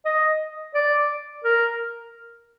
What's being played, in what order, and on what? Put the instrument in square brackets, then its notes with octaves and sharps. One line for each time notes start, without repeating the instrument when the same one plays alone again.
[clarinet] D#5
D5
A#4